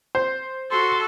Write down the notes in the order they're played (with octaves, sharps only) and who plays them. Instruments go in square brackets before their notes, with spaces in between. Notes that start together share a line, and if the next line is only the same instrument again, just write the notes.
[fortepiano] C5
[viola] F#4 A4 [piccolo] C6